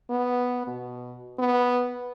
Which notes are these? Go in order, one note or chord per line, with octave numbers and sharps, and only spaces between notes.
B3
B2
B3